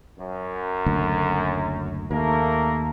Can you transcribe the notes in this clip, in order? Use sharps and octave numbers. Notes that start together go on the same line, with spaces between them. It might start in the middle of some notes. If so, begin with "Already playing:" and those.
F#2
F#1 D2
D#2 A3 A#3 A#4